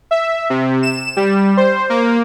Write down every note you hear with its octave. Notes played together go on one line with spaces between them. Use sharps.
E5
C3
E7
G3
C5
A#3